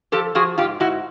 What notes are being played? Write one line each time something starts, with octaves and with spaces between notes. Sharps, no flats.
F3 G4 A4
F3 F#4 G#4
G#2 F4 G4
G#2 E4 F#4